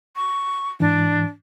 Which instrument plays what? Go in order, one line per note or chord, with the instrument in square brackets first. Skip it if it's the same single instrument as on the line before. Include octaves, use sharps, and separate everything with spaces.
[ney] C#6
[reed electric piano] G#2 E3 [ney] D4